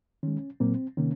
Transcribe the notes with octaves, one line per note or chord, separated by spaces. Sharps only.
D#3 G#3 C#4
A#2 F#3 A#3 C4
C3 D#3 A#3 C#4